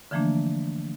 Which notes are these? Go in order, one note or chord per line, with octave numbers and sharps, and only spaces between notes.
D3 E3 F3 A3 A#3 D4